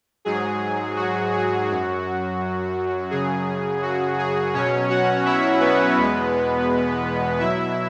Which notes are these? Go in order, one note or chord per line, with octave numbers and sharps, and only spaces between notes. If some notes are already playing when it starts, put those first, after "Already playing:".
G#2 F#3 G#4
F#4
G#4
F#2 F#3 F#4
F#2 C#3 F#3 G#4
F#4
G#4
B2 F#3 C#4 C#5
F#4 F#5
E4 E5
B3 B4
E2 B2 G#3
B2 F#3 E4 E5